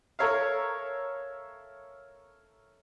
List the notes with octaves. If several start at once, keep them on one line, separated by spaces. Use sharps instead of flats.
A4 A#4 C#5 E5 F5